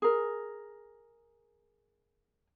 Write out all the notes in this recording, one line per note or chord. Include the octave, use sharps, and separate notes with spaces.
G#4 A#4